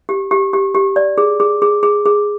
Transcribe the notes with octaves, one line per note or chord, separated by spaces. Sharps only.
G4
G4
G4
G4
D5
G#4
G#4
G#4
G#4
G#4